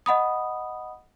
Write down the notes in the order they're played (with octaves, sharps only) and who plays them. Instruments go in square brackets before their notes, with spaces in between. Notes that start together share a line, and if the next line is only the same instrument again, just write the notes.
[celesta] D#5 F#5 B5 D#6